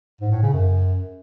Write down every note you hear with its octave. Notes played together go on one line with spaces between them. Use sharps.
G#2
A2
C#3
F#2